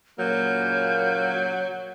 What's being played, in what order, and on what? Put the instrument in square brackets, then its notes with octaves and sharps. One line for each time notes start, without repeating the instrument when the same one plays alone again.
[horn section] A#2 C#3 A#3 [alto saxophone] F#3 [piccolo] G6